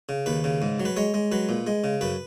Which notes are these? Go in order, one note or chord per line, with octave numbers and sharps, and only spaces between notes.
C#3
D#2 B4
C#3
G#2
F#3
B4
G#3 C#5
G#3
F#3 B4
A#2
G#3
C#3
F#2 B4